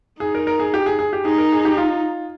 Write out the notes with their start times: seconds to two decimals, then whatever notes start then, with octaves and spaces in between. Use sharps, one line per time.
0.20 D#4 G#4
0.35 A#4
0.47 A#4
0.60 G#4
0.74 G4
0.86 G#4
0.99 G#4
1.13 G4
1.25 D#4 G#4
1.38 A#4
1.52 G#4
1.65 G4
1.77 F4